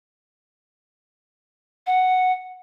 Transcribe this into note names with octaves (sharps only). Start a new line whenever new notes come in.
F#5